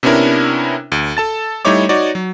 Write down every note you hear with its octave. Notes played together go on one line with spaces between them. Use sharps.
C3 B3 C#4 D4 E4 A#4
D2
A4 A5 A6
G3 A3 D#4 E4 C#5 D6
D#4 F#4 C#5 D5
F#3